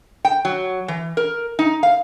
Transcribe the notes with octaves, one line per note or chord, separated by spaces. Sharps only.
G5
F#3
E3
A#4
D#4
F5